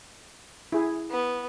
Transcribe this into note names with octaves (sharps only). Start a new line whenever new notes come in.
E4 G#4
B3